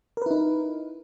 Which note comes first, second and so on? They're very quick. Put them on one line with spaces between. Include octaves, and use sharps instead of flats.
A#4 B4 E4 D#4